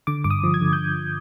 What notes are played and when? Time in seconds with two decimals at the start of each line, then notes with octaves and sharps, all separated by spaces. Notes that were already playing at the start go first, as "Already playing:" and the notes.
0.07 D3 D6
0.24 G2 D6
0.31 D#6
0.43 F3
0.54 G#6
0.61 D3
0.73 G6